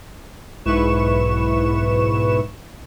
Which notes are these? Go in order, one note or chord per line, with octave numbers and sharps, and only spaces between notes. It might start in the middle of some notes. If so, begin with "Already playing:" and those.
B1 G#2 E4 B4 C#6 E7